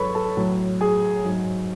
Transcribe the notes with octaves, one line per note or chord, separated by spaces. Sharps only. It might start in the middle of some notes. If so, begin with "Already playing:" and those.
Already playing: G#2 F#3 A4 B4 C#5 B5 C#6
A4 A5
A2 F#3
G#4 G#5
G#2 F#3